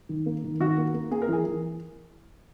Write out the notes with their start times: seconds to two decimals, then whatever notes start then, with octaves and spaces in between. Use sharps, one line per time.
0.09 D#3
0.26 A#3
0.44 D#3
0.60 D#3 F#4
0.77 A#3
0.94 A#3
1.11 A#3 G#4
1.22 A#4
1.28 E3 G#4
1.45 E3